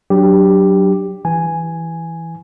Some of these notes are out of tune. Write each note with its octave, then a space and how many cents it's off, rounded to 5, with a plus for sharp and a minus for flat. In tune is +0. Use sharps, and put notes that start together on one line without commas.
F#3 +15 D4 +0 G4 +0
E3 -5 G#5 +0